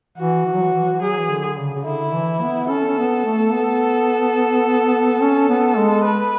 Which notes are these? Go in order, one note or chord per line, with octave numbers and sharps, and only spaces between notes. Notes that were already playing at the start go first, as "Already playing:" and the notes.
E3 F#4
E3
F#3
E3
E3
E3
F#3 G#4
E3
D3
C#3
C#3
D3 E4
E3
B3
C#4 A4
C#4
B3
A3
B3
C#4
B3
G#3
B4